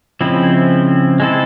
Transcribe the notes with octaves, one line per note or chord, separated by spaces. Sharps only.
C#3 F3 G#3 C4 E4
G#3 C4 E4 A4